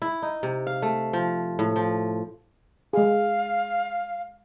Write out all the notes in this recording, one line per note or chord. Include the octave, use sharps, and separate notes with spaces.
E4
D#4
C3
F5
A3
F3
A2
F3
G#3 G#4 F5